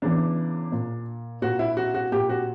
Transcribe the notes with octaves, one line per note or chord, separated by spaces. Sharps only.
E2 C#3 E3 D4
A#2
A#2 F#4
E4
F#4
F#4
A#2 G4
F#4